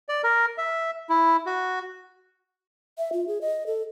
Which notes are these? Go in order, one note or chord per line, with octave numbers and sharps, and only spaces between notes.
D5
A#4
E5
E4
F#4
E5
F4
G#4
D#5
A4